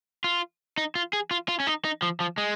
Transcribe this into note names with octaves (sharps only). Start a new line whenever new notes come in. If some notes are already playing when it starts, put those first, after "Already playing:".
F4
D#4
F4
G#4
F4
F4
C#4
D#4
D#4
F3
F3
G#3